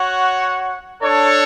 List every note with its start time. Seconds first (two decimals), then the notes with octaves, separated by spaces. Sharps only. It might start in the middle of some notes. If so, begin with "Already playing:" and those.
Already playing: F#4 C#5 F#5
1.02 D4 A4 C#5